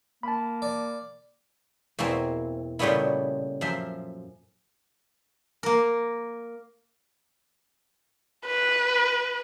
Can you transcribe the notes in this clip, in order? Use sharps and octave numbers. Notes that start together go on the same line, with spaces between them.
A#3 A5 B5
D5
E2 B2 E3 A#3 C4
A#2 C#3 G3 A3 B3 E4
F#2 F3 E5 C6
A#3 A#4
B4